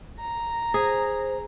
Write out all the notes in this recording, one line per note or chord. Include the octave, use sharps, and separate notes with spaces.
A#5
G#4 C5